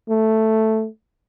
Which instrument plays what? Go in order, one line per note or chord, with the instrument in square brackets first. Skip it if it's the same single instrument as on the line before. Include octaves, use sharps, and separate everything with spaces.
[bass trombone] A3